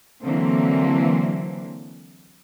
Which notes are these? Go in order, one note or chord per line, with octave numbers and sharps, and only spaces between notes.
D3 E3 F#3 A#3 C4